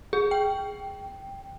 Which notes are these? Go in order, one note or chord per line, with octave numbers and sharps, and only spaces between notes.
G#4
G5